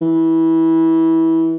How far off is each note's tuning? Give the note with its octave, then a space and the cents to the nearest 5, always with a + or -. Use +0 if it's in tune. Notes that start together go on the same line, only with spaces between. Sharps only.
E3 -20